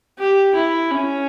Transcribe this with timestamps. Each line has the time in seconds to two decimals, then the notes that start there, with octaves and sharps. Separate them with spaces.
0.18 G4
0.55 E4
0.91 C#4